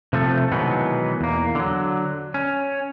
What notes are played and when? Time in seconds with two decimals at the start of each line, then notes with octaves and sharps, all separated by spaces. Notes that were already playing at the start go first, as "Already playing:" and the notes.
0.13 C3 F3 A3 A4
0.52 B2 D#3 E3 F#3 G#3 B3
1.21 E2 A#3
1.55 D3 F#3
2.34 C#4